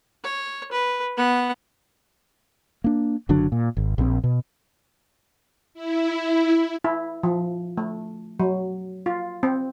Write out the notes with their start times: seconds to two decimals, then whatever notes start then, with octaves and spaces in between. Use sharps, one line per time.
0.24 C#5
0.72 B4
1.17 B3 F#5
2.84 A#3 D4
3.29 F#1 D3 F#3 D4
3.52 A#2
3.77 G#1
3.98 A#1 C4
4.24 B2
5.74 E4
6.84 E4
7.23 F3
7.77 A3
8.40 F#3
9.06 F4
9.43 C4